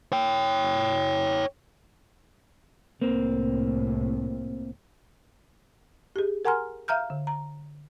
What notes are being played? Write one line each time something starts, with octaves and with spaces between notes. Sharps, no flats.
C#5 G5
C2 A2 A#3 C4
G4 G#4
A#4 F#5 G#5 A#5 C6 F6
E5 F5 A#5 F6 G6
D3
A#5